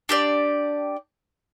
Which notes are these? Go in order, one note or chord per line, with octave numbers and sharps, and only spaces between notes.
D4 G4 D5